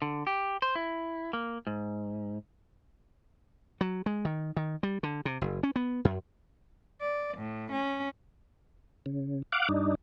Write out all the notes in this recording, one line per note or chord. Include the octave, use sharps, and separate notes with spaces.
D3
G4
C5
E4
A#3
G#2
F#3
G#3
D#3
D#3
G3
D3
C3
F#1
C#4
B3
F#2
D5
A2
C#4
C#3
F5 F#5 D6
G2 D4 D#4